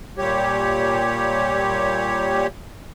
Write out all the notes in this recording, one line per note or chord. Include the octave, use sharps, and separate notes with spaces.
A#2 G3 G4 C#5